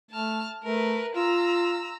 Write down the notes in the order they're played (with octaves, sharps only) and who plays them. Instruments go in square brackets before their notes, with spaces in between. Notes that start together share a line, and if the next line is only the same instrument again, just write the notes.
[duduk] A3 [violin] A5 F6
[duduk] A3 [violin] A#4 B4
[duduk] F4 [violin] A#5 E6